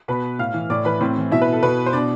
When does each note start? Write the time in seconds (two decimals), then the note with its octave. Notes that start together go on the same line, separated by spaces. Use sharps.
0.08 B2 B4 B5
0.39 A2 F5 F6
0.54 E3
0.70 A2 D5 D6
0.85 E3 B4 B5
1.01 A2 C4 C5
1.17 E3
1.31 B2 E4 E5
1.41 B4
1.53 A4
1.63 B2 B4
1.86 C5
1.93 B2 D4 D5